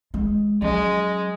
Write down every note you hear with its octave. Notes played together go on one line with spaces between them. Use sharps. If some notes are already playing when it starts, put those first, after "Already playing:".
G#3
F#3 G#3 C#4